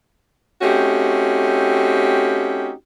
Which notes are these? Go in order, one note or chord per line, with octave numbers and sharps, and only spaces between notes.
A3 C4 C#4 D#4 F#4 G4